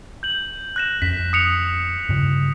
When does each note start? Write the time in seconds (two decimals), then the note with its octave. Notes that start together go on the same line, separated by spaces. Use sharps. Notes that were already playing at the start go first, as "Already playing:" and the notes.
0.23 G6 F#7
0.76 F#6 A#6 E7
1.02 F2 C#4 B6
1.33 D#6 C#7 F7
2.09 G2 C#3